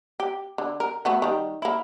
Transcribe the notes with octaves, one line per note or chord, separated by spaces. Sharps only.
G4
D3
A#4
A3 B3 F#4
D#3 G3
A#3 E4